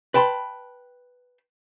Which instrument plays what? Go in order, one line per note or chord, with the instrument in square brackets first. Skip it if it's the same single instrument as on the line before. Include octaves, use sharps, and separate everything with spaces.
[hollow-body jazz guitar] B4 G5 A5 B5 C6